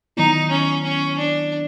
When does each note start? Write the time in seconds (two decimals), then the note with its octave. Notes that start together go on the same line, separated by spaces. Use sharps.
0.17 D#3 F#3 B3 D#4 E4
0.51 C#4
0.84 C#4
1.18 D4